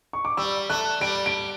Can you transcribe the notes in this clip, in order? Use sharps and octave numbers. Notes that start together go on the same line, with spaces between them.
C#6
D6
G3 E6
A3 F#6
G3 D7
D7